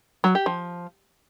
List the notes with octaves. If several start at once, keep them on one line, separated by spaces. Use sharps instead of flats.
F#3
G4
F3